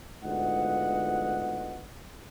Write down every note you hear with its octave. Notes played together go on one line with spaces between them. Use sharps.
D2 G#2 B3 F4 D#5 F#5